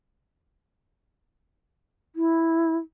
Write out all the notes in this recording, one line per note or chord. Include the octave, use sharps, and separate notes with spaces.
E4